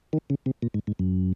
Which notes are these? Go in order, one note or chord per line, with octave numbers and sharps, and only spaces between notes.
D#3
C#3
C3
A#2
G#2
G#2
F#2